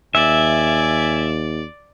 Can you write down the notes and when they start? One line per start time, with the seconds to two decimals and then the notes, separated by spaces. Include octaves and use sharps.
0.15 D#2 D5 E5 G#5